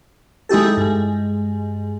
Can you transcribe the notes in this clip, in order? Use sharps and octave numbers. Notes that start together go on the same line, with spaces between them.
G#3 D#4 E4 G4 A4
G2 G#3